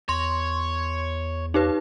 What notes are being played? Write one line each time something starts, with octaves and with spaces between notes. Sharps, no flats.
E2 C#5 C6
D#4 G4 B4